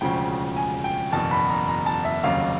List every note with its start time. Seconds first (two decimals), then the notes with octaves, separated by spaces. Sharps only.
0.01 E1 D2 C#3 F3 G5
0.56 G#5
0.84 G5
1.12 F#1 E2 B2 A5
1.31 B5
1.50 A#5
1.68 A#5
1.86 A5
2.05 E5
2.23 F1 D#2 C#3 F#3 F5